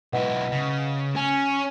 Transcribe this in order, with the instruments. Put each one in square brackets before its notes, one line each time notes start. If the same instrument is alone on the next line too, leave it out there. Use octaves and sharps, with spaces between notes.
[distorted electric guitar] B1 E4 [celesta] B4 D#5 F#5
[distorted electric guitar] C#3
[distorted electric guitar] C#4 [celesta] G#5